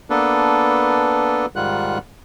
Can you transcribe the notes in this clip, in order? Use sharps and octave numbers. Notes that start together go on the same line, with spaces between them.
A#3 B3 D4 A4 B4
G#2 D#3 G3 F4 F#5 F#6